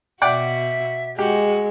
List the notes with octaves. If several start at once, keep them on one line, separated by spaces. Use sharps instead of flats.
B2 F#4 D5 E5 F#5 G5
G#3 F#4 G4